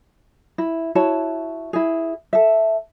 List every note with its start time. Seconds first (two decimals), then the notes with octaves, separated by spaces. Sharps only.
0.58 E4
0.95 E4 F#4 C#5 A5
1.73 E4 G#4
2.33 A4 E5